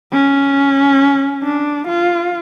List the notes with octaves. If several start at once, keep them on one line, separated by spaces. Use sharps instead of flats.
C#4
D4
F4